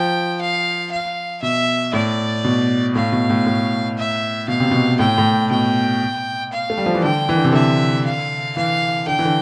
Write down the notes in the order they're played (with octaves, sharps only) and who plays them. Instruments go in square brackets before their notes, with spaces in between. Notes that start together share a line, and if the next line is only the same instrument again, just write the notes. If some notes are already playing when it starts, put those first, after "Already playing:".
Already playing: [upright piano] F3 [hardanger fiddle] G5
[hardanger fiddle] F5
F5
[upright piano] B2 [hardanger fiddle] E5
[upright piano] A2 [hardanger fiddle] D5
[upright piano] B2
[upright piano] A2 [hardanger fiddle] F5
[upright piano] B2
A2
A2
[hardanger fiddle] E5
[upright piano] B2 [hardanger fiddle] F5
[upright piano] C3
B2
[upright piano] A2 [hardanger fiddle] G5
[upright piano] A2
[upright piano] B2 [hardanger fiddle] G5
[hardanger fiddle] F5
[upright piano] A3
G3
F3
E3
[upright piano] D3 [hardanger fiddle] G5
[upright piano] E3
D3
C3
[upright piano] D3 [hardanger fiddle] E5
[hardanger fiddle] F5
[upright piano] E3 [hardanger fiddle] F5
[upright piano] D3 [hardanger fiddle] G5
[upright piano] E3
D3